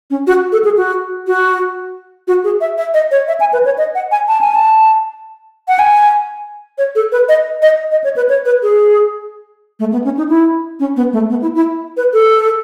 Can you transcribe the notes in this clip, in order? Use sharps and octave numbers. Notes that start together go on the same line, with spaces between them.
C#4
F#4
A4
G#4
F#4
F#4
F#4
G#4
E5
E5
D#5
C#5
E5
G#5
B4
C#5
D#5
F#5
G#5
A5
G#5
A5
F#5
G#5
C#5
A4
B4
D#5
D#5
D#5
C#5
B4
C#5
B4
G#4
A3
B3
C#4
D#4
E4
C#4
B3
A3
B3
E4
E4
B4
A4